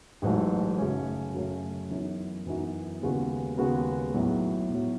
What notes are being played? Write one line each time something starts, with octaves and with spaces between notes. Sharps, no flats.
A1 G#2 F#3 A3
F#2 C#3 F#3 A3 C#4
F#2 C#3 F#3 A3 C#4
F#2 E3 B3 D#4 F#4
F#2 E3 B3 D#4 F#4
D#2 C#3 G#3 B3 F#4
D#2 C#3 G#3 B3 F#4
B1 A2 F#3
B1 A2 F#3